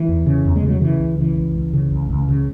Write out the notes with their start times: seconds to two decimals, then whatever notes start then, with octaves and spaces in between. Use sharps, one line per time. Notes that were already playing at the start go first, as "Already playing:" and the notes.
Already playing: E3
0.08 E2
0.26 C#3
0.45 E2
0.56 G#3
0.63 C#3
0.68 F#3
0.81 C#3 E3
1.00 C#2
1.18 C#3 E3
1.37 C#2
1.55 C#2
1.73 C#3
1.91 C#2
2.10 C#2
2.29 C#3